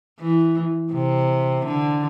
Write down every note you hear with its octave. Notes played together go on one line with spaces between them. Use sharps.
E3
C3
D3